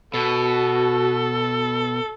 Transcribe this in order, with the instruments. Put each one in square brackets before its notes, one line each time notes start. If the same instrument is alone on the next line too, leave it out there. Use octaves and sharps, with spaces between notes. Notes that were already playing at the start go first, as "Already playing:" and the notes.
[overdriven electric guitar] B2 [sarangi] F#4 [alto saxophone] A4